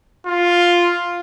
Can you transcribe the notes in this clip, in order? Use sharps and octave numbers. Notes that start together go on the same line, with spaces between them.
F4